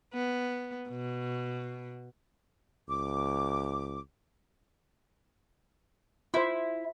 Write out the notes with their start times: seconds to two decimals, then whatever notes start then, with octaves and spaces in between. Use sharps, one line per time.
0.14 B3
0.89 B2
2.89 C#2 D6
6.34 E4 F4 C5